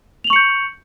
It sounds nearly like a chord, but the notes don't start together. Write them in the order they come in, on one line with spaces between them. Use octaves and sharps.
F7 F#7 C#6 C#7 G6